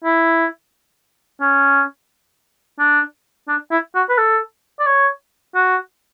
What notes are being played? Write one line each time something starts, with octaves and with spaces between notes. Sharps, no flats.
E4
C#4
D4
D4
E4
F#4
B4
A4
D5
C#5
F#4